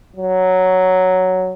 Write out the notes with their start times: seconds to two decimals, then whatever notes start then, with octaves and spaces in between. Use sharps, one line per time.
0.16 F#3